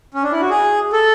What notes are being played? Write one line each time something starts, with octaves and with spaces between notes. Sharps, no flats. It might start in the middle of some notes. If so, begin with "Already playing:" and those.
C#4
D4
E4
F#4
G#4
A4